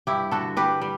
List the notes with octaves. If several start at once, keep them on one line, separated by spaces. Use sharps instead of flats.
G2 E4 G4
D3 F#4 A4
G3 G4 B4
G3